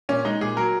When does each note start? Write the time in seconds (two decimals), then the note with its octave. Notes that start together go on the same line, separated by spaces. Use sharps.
0.09 A#2 C#4
0.25 G#3 D#4
0.41 A#2 G#4
0.57 F#3 A#4